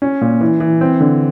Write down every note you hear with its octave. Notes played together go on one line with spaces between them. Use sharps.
C#4
A#2
E3
E3
C4
D3